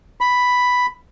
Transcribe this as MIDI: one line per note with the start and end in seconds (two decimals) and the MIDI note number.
0.21 0.86 83